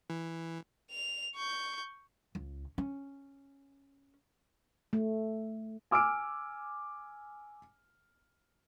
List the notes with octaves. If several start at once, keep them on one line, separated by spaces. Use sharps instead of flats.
E3
F7
C#6 G6
C#2
C#4
A3
G#5 D6 E6 F6 D7